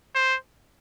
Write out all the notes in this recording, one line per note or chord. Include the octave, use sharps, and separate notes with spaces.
C5